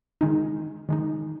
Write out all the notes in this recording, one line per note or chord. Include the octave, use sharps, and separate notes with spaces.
D#3 G#3 D#4
D#3 G#3 D#4